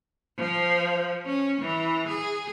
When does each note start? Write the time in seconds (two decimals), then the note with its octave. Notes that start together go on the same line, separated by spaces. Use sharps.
0.38 F3
1.26 C#4
1.61 E3
2.08 G#4